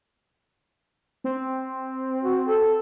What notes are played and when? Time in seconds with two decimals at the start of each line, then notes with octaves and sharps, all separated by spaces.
1.24 C4
2.23 F#4
2.47 A4